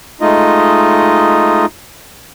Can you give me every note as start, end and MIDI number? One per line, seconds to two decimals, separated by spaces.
0.21 1.66 56
0.21 1.66 57
0.21 1.66 63
0.21 1.66 65
0.21 1.66 75